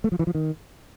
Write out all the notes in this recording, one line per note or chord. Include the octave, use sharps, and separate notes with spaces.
A3
F3
E3
F3
D#3